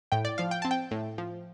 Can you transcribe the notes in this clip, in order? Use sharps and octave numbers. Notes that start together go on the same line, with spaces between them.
A2 G5
D5
F3 F5
G5
C4 A5
G5
A2
F3